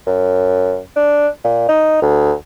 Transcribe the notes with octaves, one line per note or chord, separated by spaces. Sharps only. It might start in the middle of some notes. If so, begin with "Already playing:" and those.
F#2
D4
A#2
D#4
D2